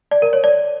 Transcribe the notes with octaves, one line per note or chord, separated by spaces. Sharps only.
D5
A#4
C#5
D5